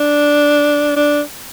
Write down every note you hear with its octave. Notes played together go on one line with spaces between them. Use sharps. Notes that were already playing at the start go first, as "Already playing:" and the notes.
Already playing: D4
D4